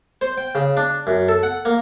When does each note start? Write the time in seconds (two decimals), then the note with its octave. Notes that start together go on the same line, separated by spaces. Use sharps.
0.21 C5
0.38 G5
0.55 C#3
0.77 D4
1.07 F#2
1.28 A4
1.43 F#5
1.65 A#3